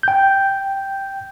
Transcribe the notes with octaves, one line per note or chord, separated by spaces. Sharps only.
G5 G6